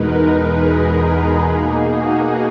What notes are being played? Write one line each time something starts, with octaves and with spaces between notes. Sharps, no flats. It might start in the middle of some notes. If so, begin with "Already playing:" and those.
Already playing: E2 B2 G#3 D#4 A#4 B4
G#4
B2 A#3 D#4 G#4
F#4